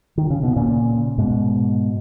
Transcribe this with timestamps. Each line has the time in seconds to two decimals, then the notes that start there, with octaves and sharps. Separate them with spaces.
0.18 D#3
0.30 C#3
0.43 B2
0.56 A#2 C#3
1.18 G#2 B2